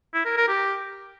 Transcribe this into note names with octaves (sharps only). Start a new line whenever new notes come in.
E4
A#4
A#4
G4